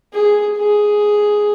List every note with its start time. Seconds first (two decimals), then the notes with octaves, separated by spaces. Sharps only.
0.13 G#4
0.57 G#4